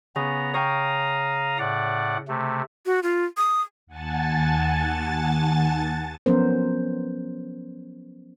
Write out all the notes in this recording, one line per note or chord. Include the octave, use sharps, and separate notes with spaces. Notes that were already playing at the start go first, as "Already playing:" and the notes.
C#3 B3 A#5
C#5 F5 G5 A#5 D#6
A2 D5 F#5
C3 A3
F#4
F4
D#6
D#2 F#5 G#5 A5 A6
F3 F#3 B3 C#4 A#4 C5